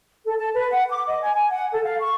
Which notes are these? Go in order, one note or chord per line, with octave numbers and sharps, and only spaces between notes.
A4
A5
B4
F#5
D6
D#5
G#5
G#5
F#5
A4
F5
C#6